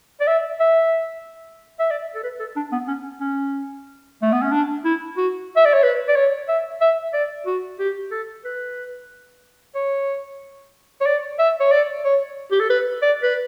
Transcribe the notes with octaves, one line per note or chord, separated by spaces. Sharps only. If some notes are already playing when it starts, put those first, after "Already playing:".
D5
E5
E5
E5
D5
A4
B4
A4
D4
B3
C#4
C#4
A3
B3
C#4
D4
E4
F#4
E5
D5
C#5
B4
D5
C#5
E5
E5
D5
F#4
G4
A4
B4
C#5
C#5
D5
E5
C#5
D5
C#5
G4
A4
B4
D5
B4